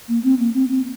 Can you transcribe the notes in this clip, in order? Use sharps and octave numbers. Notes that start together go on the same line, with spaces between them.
A#3
C4
A#3
C4
C4